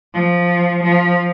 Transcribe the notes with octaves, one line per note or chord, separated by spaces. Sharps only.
F3
F3